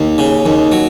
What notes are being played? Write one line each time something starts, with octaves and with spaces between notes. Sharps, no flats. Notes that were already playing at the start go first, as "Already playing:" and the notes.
Already playing: D#2
C#3
D#2
F#3